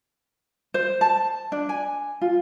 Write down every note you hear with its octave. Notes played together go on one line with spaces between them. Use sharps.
C5
A5
D4
G#5
F4